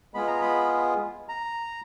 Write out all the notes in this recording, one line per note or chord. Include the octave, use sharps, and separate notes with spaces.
G#3 B3 F4 G#4 B5
A#5
B5
A#5